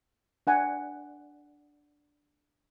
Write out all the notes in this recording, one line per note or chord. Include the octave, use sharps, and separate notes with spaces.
D4 F#5 G#5